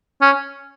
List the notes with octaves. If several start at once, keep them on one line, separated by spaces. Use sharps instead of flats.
C#4